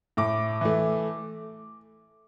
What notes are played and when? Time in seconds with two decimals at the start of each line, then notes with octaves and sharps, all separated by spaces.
0.17 A2 D6
0.61 E3 A3